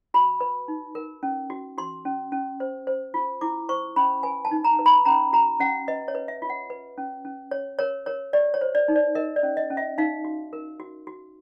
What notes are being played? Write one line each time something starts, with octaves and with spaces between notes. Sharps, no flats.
F#4 B5
B4
D#4
A#4
C#4
F#4
F#4 C6
C#4
C#4
C5
C5
F4
E4 D6
C5 C#6
C#4 B5
B4 G#5
A5
D#4
A#5
B4
B5
C#4 A#5
F#4 A#5
C#4 F#5
B4 D#5
C#5
B4
E5
F4
F#5
B4
C#4
C#4
C#5
A#4 C#5
A#4 C#5
G4 D5
C#5
C5
D5
D#4
D5
A#4 D#5
D5
C#4
D#5
C#4
E5
D#4 F5
F#4
A#4
F#4
F#4